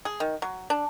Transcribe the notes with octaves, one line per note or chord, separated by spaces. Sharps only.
G#4
D#3
F#3
D4